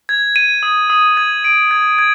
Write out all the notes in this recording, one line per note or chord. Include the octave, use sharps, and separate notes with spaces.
G#6
D#7
D#6
D#6
G#6
D7
G#6
G#6